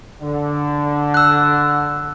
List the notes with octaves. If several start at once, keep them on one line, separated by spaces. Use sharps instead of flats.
D3
E6 F#6